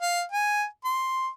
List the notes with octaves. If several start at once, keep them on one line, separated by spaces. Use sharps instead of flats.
F5
G#5
C6